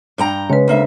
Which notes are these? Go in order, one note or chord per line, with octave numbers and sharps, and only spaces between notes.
G2 G5 A#5
C#3 G#3 B4 C#5
D2 A#3 E5